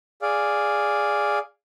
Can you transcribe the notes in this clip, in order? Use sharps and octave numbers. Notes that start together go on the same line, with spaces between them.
G#4 D5 F5